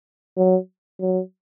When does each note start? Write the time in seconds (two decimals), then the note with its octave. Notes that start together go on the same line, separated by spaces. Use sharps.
0.37 F#3
1.00 F#3